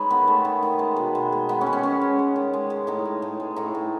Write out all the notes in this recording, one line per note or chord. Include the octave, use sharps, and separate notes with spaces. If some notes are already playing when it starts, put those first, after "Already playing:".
Already playing: G#3 D#4 B4 C#5
D#3 B3
A3
D#3
D#3
G#3
B2
G#3
G#3
D#3 B3
C#4
G#3
C#4
G#3 C#4
G#3
G#3
D#3
G#3
G#3
A2 D#4
G#3
A2
G#3
A2 D#4
A2